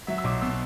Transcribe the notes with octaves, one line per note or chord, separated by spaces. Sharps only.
F#3 E5
E6
B1 D6
B2 E6